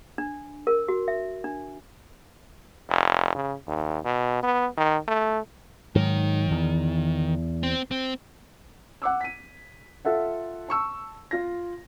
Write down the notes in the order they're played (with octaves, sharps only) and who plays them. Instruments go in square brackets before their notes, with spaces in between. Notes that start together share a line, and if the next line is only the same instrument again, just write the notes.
[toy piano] D4
A#4
F#4
E5
D4
[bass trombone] F1
C#3
D#2
B2
B3
D#3
A3
[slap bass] G#2 F#3 [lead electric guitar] D#3
[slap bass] E2
[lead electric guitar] C4
C4
[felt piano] F#5 D6 E6
B6 D#7
F4 A4 E5 F#5
A5 C#6 E6
F4 A#6